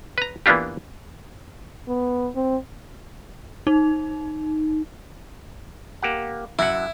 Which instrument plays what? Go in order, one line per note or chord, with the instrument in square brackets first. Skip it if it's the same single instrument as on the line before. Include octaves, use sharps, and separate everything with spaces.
[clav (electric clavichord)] B4 A#5
E3 A#3 B3 D4 F4 G4
[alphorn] B3
C4
[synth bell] D#4
[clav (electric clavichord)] A#3 G4 F#5
[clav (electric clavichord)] F#2 F#5 [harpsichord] E4